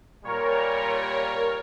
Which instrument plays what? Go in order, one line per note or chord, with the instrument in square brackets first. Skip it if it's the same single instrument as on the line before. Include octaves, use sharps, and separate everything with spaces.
[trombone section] A#2 G3 [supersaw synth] A#4 C#5